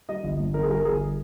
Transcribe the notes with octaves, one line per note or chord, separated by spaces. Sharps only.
G3 D#5
G1
G2
G1 A#4
G#4
G3 A#4
A#4
G1 G#4